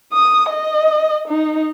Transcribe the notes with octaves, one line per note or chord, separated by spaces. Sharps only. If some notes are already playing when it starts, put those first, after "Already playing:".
D#6
D#5
D#4